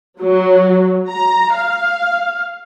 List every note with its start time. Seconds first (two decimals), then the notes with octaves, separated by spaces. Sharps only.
0.22 F#3
1.09 A#5
1.56 F5